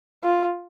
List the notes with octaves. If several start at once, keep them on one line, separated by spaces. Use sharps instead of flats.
F4